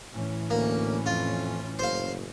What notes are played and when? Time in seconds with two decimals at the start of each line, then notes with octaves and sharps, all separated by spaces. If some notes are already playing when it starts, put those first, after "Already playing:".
0.13 A2 E3 C#4
0.50 D2 A#3
1.06 F2 F4
1.79 F#1 C5 F5